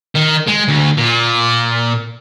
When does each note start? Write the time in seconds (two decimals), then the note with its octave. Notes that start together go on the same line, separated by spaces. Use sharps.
0.15 D#3
0.47 G#3
0.68 D2
0.97 A#2